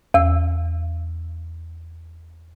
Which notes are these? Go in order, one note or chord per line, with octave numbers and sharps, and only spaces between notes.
E2 E6